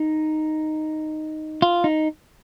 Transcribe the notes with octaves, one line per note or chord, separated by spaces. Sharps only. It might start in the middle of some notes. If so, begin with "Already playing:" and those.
Already playing: D#4
F4
D#4